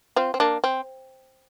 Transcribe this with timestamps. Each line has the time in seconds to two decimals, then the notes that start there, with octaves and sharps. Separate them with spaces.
0.16 C4 F4
0.34 C4
0.40 A#3 D4
0.64 C4